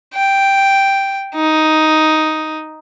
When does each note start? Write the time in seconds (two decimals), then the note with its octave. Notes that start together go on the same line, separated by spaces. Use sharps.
0.15 G5
1.35 D#4